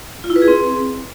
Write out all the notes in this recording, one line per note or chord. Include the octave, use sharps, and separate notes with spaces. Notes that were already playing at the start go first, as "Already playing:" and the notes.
F4
E4
B4
G#4
C4